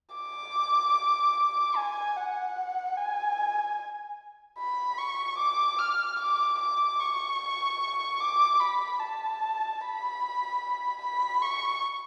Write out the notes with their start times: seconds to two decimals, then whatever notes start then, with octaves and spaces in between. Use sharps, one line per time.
0.15 D6
1.76 G#5
2.16 F#5
2.97 G#5
4.58 B5
4.98 C#6
5.38 D6
5.78 F6
6.19 D6
6.59 D6
6.99 C#6
8.20 D6
8.60 B5
9.00 A5
9.80 B5
11.02 B5
11.42 C#6